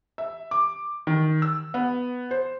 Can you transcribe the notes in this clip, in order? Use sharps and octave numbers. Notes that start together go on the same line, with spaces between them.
E5
D6
D#3
E6
B3
C5